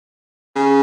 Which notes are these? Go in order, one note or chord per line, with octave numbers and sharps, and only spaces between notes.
C#3